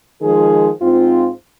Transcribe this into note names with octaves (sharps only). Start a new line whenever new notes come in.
D#3 F3 G#3 G#4
G#2 C4 F4